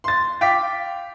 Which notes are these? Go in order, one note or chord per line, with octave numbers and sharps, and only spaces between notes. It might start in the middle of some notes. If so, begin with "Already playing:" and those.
C6 A6
F5 G5 D6 B6